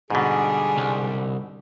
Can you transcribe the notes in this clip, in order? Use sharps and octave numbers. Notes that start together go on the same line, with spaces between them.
G#2 B2 D3 G3 D4 G#4
C2